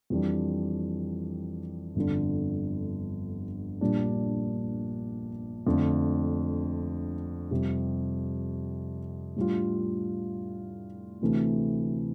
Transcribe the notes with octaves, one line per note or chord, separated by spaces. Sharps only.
F2 E3 G3 D4
G1 F2 D3
A#1 A#2 G3 D4
F2 D3 A3
F2 C3 G3
A2 G3 D4 F4
D2 C3 E3 A3 C4